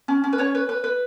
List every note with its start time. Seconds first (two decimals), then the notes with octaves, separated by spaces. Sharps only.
0.08 C#4
0.24 C#4
0.33 B4
0.38 C#4 C#5
0.55 B4
0.69 B4
0.84 B4